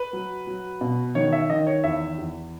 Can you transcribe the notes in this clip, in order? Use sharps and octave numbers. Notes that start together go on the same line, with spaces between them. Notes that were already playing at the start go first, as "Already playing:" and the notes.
Already playing: B4
F#3
F#3
B2
D#3 C#5
E5
D#3 D#5
C#5
E2 E5
E2